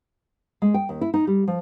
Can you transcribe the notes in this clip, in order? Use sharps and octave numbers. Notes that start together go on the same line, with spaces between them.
G#3
G5
D#2
E4
D#4
G3
F3